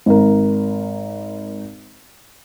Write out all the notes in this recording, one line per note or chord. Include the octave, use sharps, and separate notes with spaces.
G#1 A#4